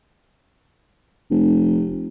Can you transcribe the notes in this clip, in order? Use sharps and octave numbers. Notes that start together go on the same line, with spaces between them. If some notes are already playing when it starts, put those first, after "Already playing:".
F1